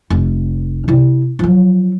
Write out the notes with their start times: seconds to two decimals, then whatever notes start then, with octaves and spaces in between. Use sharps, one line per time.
0.10 F1
0.88 C3 E4
1.39 F3 F#3